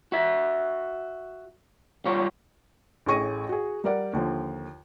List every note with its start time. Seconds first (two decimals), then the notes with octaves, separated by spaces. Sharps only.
0.12 F#4 E5
2.06 G3 F4 C#5
3.06 A1 A2 G#4 C#6 A#6 D#7
3.49 F#4 G#4
3.84 G3 A#4 D5 F#5
4.13 D#2 D3 F3